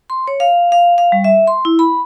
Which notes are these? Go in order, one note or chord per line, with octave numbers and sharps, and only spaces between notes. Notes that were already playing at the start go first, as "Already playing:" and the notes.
C6
C#5
F5
F5
F5
G3
E5
C6
E4
B5